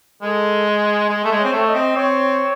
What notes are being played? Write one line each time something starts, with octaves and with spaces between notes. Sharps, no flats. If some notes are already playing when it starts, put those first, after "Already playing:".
G#3 A4
G#4
G#3
A3
G#3
C#5
C4
A3
D#5
C4
C4 C#5